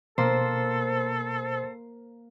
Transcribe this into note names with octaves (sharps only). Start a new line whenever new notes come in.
B2 A#3 A4 C5